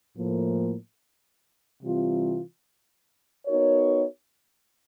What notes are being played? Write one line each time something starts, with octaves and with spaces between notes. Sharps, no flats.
A2 F3 A#3
C3 E3 G3 C4 F4
B3 D#4 F#4 A#4 C#5